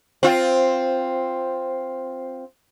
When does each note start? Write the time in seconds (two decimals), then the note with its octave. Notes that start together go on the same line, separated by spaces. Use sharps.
0.23 C4 F4